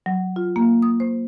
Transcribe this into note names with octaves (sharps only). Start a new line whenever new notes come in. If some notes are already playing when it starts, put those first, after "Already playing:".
F#3
F4
A#3
D#6
C5